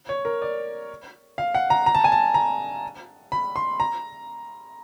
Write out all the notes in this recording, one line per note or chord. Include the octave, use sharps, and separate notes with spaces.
C#5
A#4
D5
F5
F#5
A#5
A#5
A5
G#5
A5
A#5
B5
C6
A#5